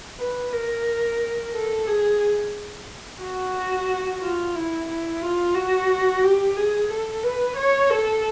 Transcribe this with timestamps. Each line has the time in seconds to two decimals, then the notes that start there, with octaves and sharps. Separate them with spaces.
0.19 B4
0.52 A#4
1.53 A4
1.87 G#4
3.22 F#4
4.21 F4
4.55 E4
4.88 E4
5.21 F4
5.55 F#4
6.23 G4
6.57 G#4
6.90 A4
7.24 B4
7.56 C#5
7.90 A4